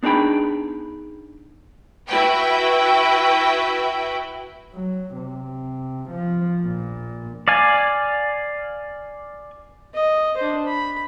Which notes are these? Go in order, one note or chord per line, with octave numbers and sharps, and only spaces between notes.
B3 D4 D#4 G#4 G5 B5
E4 F#4 B4 G5
F#3
C3
F3
A#1 A#2
D5 F5 G#5
D#5
D4 C5
B5